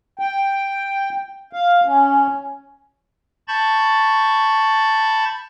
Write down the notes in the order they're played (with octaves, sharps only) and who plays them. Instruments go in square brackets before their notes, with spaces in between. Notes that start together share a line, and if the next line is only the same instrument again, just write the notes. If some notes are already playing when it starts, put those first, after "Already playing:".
[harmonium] G5
F5
C#4
[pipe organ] A5 B5 C#6 G6 A6